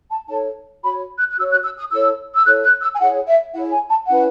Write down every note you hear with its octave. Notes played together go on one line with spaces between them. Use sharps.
A5
D#4 A4 C#5 A5
F#4 C#5 B5
F#6
F#6
F#4 C#5 E6
F#6
E6
D#6
E4 A4 C#5 E6
E6
E4 A4 C#5 F#6
F#6
E6
G#5
E4 G#4 C#5 F#5
E5
E4 G#4 C#5 F#5
G#5
A5
C#4 E4 B4 F#5